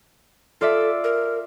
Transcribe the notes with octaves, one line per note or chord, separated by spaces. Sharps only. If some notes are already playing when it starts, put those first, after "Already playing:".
F4 A4 D5 E5
A#4